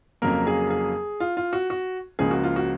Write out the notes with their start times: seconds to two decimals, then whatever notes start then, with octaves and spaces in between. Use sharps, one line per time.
0.22 F2 C#3 F#3 A#3 A#4
0.47 G#4
0.70 G#4
1.20 F4
1.37 F4
1.53 F#4
1.70 F#4
2.19 C#2 C#3 F3 A#3 G#4
2.31 F#4
2.44 F4
2.56 F#4